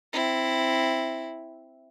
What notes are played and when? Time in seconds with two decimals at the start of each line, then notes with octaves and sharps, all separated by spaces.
0.13 C4 E4